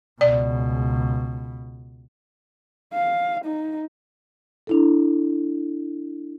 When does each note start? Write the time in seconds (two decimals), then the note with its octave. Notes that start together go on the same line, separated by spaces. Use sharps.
0.21 C#2 B2 D5
2.94 F5
3.45 D#4
4.67 D4 E4 A4